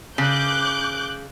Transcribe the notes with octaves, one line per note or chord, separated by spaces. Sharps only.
C#3 D6 F#6 G6